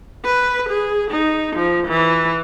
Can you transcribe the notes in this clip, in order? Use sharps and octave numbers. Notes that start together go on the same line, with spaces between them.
B4
G#4
D#4
F3
E3